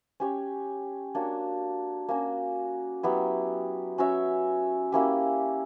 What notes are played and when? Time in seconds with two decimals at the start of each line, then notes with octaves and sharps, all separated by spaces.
0.20 C#4 G4 C#5
1.15 A#3 D4 F#4 C#5
2.09 A#3 C#4 F#4
3.03 F#3 B3 E4 G4
3.98 C#4 F#4 C#5 E5
4.92 A#3 C#4 E4 G4